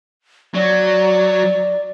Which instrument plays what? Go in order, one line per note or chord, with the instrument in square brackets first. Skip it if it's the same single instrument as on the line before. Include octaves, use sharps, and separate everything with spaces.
[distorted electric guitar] F#3 [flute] D5